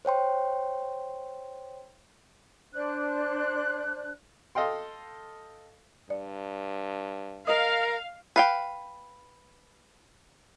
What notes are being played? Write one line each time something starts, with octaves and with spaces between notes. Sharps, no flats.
C5 C#5 G5 C6
D4 C5 D5 F#6
A4 D#5 F5 G5 C6
G2 D5
A#4 D#5 F5 D#6
B4 F5 G5